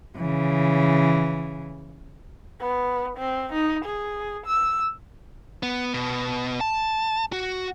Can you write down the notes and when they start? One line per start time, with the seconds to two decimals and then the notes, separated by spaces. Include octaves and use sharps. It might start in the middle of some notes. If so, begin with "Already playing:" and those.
0.17 C#3 E3
2.60 B3
3.18 C4
3.53 D#4
3.85 G#4
4.46 E6
5.63 B3
5.94 B2
6.61 A5
7.33 F#4